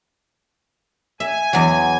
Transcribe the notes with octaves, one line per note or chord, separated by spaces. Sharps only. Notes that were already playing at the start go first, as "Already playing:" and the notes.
E5 G#5
E2 F#3